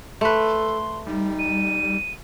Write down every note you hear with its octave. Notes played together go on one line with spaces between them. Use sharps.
A3 A4 B4 C6
G3 D#4
D#7